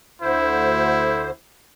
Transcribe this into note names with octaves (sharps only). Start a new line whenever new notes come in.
D2 D3 E4 C5